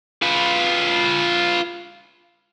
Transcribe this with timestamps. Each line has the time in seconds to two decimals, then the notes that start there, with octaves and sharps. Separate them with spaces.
0.22 F4 B4